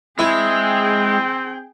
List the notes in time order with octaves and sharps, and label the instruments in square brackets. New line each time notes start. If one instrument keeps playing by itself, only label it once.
[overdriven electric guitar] G#3 [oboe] C4 [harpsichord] E4 [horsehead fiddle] G#4 G5